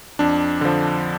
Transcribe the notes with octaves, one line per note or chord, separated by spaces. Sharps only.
F2 D4
D3 F3